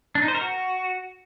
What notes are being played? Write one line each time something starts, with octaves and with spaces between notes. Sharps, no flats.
D4
D#4
C5
A#4
F#4